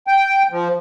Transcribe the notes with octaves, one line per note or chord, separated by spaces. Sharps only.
G5
F3